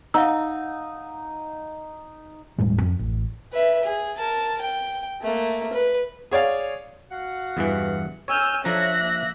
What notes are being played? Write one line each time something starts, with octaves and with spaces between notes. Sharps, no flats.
D#4 F5 F#5 E6
D#1 A2 G3 G#3
F2
A1
B4 E5
G#4
A#4 A5
G5
A3 A#3
B4
G#4 C#5 D5 F5
F#4 F5 F#5
E2 G2 E3
C#5 G#5 E6 F6 G6
F3 D4 A4 C#5 E5 A#5 F#6 A#6
A#3